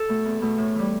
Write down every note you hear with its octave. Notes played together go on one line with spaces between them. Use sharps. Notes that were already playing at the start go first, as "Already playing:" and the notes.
Already playing: A4
B2 A3
E2
B2 A3
A2
E3 G3